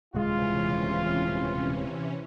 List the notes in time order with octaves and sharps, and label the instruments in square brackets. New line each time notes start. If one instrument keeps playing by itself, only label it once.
[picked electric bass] D#1 C#2 G#3 [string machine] C3 E3 C#4 [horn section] F4